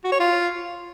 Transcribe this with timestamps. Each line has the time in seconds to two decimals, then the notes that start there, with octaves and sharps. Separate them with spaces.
0.04 F#4
0.12 C#5
0.20 F4